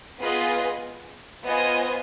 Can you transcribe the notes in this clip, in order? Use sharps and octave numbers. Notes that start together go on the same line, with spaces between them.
B3 F4 G#4 B4 D#5
B3 F4 C5 D#5 G#5